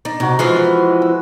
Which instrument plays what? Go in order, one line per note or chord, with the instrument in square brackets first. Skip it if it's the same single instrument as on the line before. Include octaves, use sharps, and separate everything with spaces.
[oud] D4 [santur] D#4
[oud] C3 [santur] D#4 F#4 D6
[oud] E3 F3 F4 [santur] G#3 E4
[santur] B4
E6